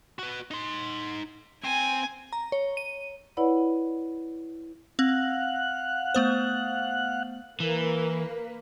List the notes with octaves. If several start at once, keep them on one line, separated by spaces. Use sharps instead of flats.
F#4 B4
D#4 C6
C4 G#5
A#5
C#5
D#7
E4 B4 C#5 D5 F#5 B5
C4 F5 F#5 F#6
A3 B3 C5
E3 A#3 B4